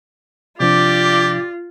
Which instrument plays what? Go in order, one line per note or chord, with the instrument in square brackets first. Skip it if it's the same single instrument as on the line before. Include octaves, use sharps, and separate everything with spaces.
[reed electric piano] C3 F3 D4 [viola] F4 [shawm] G4 [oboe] D5